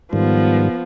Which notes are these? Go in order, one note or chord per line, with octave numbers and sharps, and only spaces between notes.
G#2 D#3 F3 G3 B3